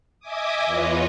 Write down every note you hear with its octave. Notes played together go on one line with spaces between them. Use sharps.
D#5 E5 G#5 D6 D#6
E2 F4 B4 C#5 D#5